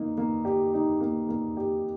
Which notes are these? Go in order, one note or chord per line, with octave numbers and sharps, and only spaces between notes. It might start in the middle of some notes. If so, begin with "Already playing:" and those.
Already playing: A#3 D#4
A#3
G4
D#4
A#3
A#3
G4